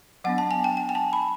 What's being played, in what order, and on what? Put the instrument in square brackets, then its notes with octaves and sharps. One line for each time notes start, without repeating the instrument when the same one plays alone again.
[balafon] F#3 B3 D4 F#5
A5
G#5
G5
G5
G#5
A5
B5